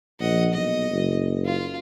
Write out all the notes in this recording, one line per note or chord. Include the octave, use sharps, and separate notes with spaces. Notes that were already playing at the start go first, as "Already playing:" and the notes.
A#1 D#5 F#5
B1 D#5
F#1
F4